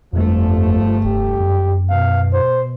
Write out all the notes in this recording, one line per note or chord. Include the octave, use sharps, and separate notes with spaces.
G1 F2 F3 A3
F1 G4
F#2
B2 F5
C5